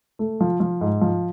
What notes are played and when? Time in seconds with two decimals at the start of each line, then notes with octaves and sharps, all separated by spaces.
0.19 A3
0.40 F3
0.60 F3
0.81 G#2
1.01 F3